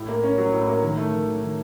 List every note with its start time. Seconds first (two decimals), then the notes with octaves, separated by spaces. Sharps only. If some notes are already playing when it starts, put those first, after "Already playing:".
Already playing: A2
0.09 A#3
0.23 C#4
0.38 F#3
0.53 A2
0.67 A#3
0.83 D#3
0.97 A3
1.12 D#3
1.27 F#3
1.42 D#3